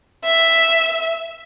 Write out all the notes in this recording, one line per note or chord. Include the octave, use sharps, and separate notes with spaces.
E5